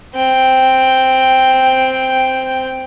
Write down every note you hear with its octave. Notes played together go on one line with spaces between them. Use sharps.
C4 G5